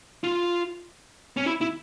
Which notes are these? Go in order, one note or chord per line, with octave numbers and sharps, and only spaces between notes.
F4
C#4
E4
E4